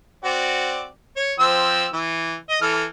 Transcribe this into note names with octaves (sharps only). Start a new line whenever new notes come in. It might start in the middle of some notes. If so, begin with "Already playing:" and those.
C4 F#4 D5
C#5
F3 C4 E6
E3
D#5
E3 A4 F6